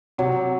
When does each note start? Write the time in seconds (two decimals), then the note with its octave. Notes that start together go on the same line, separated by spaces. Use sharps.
0.18 C3 F#3